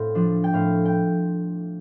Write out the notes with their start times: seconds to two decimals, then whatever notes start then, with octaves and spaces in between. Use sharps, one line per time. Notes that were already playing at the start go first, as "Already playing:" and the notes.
Already playing: A2 C4 F5
0.15 F3 D4
0.44 G5
0.53 A2 A3 C4 F5
0.85 G5